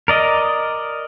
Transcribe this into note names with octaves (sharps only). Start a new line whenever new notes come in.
A#4 D5 D#5